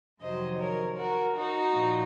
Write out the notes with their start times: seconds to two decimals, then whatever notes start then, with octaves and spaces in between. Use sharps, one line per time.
0.21 F2 C3 D#3 F#3 C5 D#5
0.59 A#4 C#5
0.97 F#4 A#4
1.36 D#4 F#4
1.74 A#2 F3